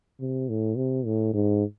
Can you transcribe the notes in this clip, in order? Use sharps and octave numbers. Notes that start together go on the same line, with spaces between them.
C3
A2
C3
A2
G#2